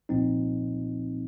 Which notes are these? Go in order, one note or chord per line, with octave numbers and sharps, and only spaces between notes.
C2 A#2 F3 C4 D#4